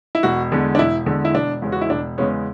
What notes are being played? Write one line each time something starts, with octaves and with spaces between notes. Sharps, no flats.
E4
E1 F#4
E2 D3 G#3
D4
E1 E4
E2 D3 G#3
E4
E1 D4
E2 C#3 G#3 B3
F#4
E4
E1 D4
E2 C#3 G#3 B3 C#4